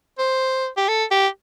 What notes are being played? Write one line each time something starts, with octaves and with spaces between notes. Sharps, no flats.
C5
G4
A4
G4